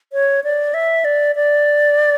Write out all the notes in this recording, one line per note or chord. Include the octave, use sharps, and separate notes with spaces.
C#5
D5
E5
D5
D5